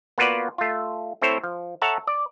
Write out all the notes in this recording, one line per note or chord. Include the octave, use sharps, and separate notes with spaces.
A#3 B3 F4 F#4 B4 D5
A3 F4
A3 C4 E4 A4 C5 C#5
F3
A4 C#5 E5 F#5 A5 A#5
D5